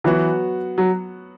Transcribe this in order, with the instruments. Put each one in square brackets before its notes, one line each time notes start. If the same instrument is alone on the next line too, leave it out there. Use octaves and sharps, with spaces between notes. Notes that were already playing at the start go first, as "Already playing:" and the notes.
[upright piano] E3 [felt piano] F#3 B3 F#4
[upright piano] F#3